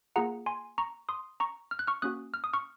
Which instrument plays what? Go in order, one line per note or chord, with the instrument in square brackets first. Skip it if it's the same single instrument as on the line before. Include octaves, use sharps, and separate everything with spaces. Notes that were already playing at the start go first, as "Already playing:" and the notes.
[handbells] A#3 F4 G#4 F#5 A#5
G#5 C6
A#5 C#6
C6 D#6
A#5 C#6
F6
F#6
C#6 F6
A#3 C#4 F#4 D#6 F#6
F6
D#6
C#6 F6